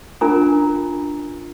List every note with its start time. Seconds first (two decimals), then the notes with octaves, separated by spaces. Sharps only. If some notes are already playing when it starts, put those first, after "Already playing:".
0.21 C#4 D4 F4 A#4 G#5 A#5